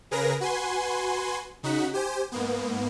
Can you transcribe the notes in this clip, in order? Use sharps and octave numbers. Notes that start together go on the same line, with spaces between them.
C#3 G#4 A#4 B4 A#6
F#4 B4 G#5 C6
C#3 D#4 F#4 F#5 B6
G4 C5 G#5
G#2 A#3 B3